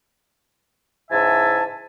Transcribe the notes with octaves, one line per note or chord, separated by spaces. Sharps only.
G#2 C#3 E3 E5 G#5 A5